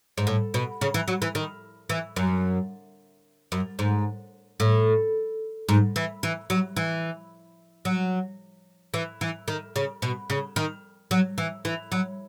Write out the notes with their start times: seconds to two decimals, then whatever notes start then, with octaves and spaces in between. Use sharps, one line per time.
0.18 G#2
0.27 A2
0.54 B2
0.81 C#3
0.94 E3
1.08 F#3
1.22 E3
1.35 D#3
1.90 E3
2.16 F#2
3.52 F#2
3.79 G#2
4.60 A2
5.69 G#2
5.96 E3
6.23 E3
6.50 F#3
6.77 E3
7.85 F#3
8.94 E3
9.21 E3
9.48 D#3
9.76 C#3
10.02 B2
10.30 C#3
10.56 D#3
11.11 F#3
11.38 E3
11.65 E3
11.92 F#3